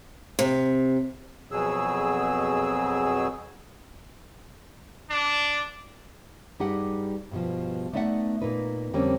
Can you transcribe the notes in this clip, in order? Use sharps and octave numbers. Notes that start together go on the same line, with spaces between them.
C3
F2 B2 F#3 G#4 E6
D4
G2 G3 D#4 G4 G#4 F#5
G2 B2 F3
A3 B3 D#4 D5 E5 F#5
A#2 A#3 D#4 B4
F2 D3 G3 A#3 C4 C#4